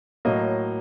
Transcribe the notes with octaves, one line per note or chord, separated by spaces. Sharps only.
A2 F#3 A#3 D#5